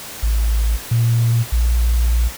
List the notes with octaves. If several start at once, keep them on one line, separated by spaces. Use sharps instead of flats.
A1
A#2
A#1